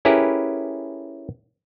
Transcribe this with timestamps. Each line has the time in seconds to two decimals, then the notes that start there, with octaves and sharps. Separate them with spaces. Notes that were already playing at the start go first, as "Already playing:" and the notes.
0.05 C#4 E4 G4 G#4 A#4 B4